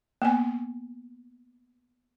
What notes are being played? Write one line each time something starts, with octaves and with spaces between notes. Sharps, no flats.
A#3 B3 G#5